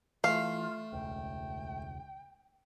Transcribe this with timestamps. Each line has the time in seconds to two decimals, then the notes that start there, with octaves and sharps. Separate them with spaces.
0.24 E3 A3 F4 F5
0.92 E1 C#2 G5